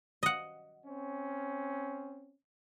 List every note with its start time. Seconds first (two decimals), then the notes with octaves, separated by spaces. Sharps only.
0.23 D#5 F#5
0.85 C4 C#4